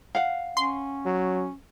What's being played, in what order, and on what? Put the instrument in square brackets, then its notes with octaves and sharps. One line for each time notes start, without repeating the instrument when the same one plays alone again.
[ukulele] F5 F#5
[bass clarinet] C#4 [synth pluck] C6
[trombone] F#3